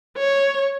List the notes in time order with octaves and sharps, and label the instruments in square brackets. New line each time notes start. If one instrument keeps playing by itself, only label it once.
[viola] C#5